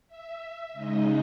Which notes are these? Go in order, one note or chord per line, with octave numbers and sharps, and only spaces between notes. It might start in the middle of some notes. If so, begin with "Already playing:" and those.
E5
C#3 G#3 D#4 D#5